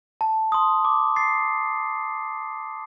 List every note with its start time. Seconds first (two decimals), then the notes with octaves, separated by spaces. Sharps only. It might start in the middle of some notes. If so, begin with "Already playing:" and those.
0.21 A5
0.52 C6 D#6
0.85 D6
1.16 A6 C7